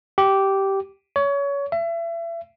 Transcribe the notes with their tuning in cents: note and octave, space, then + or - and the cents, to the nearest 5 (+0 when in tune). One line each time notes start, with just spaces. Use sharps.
G4 -10
C#5 +25
E5 +35